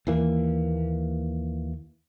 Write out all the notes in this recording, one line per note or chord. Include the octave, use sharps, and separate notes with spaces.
D#2 E3 A#3